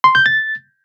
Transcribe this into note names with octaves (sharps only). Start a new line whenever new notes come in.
C6
G6
A6